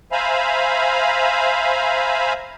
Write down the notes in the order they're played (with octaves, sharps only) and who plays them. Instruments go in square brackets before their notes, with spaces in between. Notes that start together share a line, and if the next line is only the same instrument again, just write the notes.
[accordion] C5 E5 F5 G#5 A#5 B5